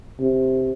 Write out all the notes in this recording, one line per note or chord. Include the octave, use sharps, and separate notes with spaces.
C3